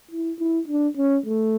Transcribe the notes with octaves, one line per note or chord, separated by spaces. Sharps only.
E4
E4
D4
C#4
A3